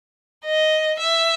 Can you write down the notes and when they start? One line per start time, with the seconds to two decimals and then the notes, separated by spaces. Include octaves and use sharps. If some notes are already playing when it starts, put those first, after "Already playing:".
0.46 D#5
0.99 E5